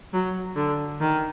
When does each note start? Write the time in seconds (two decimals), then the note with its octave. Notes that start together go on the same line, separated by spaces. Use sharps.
0.13 F#3
0.56 D3
1.00 D#3